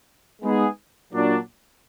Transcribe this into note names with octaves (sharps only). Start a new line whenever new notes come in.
G#3 B3 D#4 G#4
A#2 F#3 D4